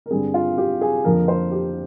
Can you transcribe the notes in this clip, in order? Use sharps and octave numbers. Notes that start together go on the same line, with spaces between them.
A#4
G2 D3 G3 C4 G#4
F4
G4
G#4
F2 D3 F3 A#3 A#4
C5
G4